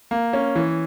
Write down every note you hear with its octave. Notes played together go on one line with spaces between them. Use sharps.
A#3
C#4
E3